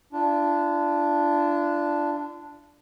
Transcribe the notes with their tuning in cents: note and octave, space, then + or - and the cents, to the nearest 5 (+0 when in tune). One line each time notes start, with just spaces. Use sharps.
D4 +0 F4 -40 A5 +0